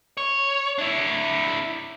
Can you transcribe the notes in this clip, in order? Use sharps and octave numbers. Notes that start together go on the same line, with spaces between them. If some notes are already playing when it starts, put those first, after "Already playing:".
C#5
D4 E4